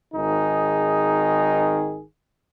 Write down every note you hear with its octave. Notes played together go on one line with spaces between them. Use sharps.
G#1 D#3 D#4 G#4